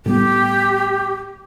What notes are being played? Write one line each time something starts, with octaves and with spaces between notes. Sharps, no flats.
A2 G3 B3 G4